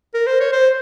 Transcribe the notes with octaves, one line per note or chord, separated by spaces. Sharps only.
A#4
C5
C#5
C5